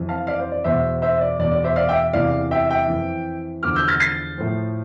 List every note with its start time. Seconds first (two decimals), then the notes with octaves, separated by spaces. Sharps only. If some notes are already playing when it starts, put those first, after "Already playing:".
Already playing: F2 E3
0.09 F5 A5
0.27 D5 F5
0.40 C5
0.52 D5
0.64 E2 B2 C5 E5
1.02 C5 E5
1.21 D5
1.39 E2 D5
1.44 B2
1.52 D5
1.64 C5 E5
1.76 D5 F5
1.89 E5 G5
2.13 E2 C3 E3 D5 F5
2.51 E5 G5
2.69 E5 G5
2.88 F2 E3
3.63 E2 D3 F3 D6 F6
3.75 E6 G6
3.88 F6 A6
4.00 A6 C7
4.38 A2 F3